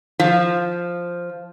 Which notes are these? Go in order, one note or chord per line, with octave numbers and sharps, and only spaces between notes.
F3